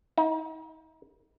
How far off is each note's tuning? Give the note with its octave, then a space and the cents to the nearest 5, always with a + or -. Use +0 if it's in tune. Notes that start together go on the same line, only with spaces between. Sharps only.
D#4 +40